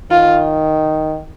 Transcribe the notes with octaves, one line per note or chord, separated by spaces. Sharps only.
D#3 F4